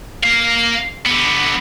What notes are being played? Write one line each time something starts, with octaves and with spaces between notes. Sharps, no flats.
A#3 F5
D3 B3